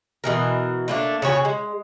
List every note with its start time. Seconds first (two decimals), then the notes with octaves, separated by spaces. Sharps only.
0.24 B2 E3 A#4
0.88 A3 A#3 D4
1.22 C#3 F#4 C#5 G#5
1.45 G#3